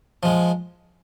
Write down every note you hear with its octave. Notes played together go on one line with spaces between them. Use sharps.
F3 G#3